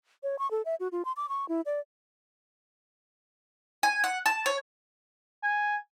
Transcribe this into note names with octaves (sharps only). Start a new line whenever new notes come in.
C#5
C#6
A4
E5
F#4
F4
C6
D6
C#6
E4
D5
G#5
F#5
A5
C#5
G#5